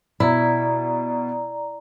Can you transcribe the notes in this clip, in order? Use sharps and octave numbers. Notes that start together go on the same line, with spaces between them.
B2 E4 D5 A#5